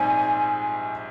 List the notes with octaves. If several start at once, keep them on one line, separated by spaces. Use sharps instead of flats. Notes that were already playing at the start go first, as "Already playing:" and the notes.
Already playing: A#1 G#2 G3 C4 D#4 G#5